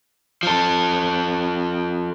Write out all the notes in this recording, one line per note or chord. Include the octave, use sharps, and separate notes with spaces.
F3 A4